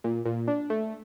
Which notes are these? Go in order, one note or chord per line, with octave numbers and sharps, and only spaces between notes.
A#2
A#2
D4
A3